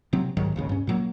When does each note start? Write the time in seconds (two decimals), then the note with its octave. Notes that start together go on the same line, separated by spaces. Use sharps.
0.13 C3 F#3 C4
0.37 C2 G#2 D#3 F#3
0.56 G#1 D#2 C#3
0.69 G2 C#4
0.87 A#2 F#3 A#3